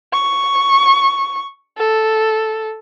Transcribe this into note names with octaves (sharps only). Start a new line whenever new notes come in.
C#6
A4